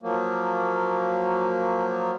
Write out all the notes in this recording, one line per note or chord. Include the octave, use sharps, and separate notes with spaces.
F3 F#3 A#3